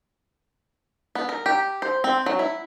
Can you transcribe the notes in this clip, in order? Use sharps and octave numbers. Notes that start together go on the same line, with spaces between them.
B3
A#4
G4
C5
C4
F#3
E4